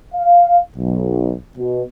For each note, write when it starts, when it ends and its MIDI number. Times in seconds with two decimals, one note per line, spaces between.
0.14 0.58 77
0.76 1.35 35
1.57 1.83 47